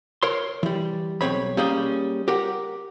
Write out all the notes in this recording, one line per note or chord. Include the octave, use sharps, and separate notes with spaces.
A#4 C#5 C6
E3 G3
B1 A#2 C4 C#5 B5
G3 A#3 C#4 G#4 G5
G4 A#4 F#5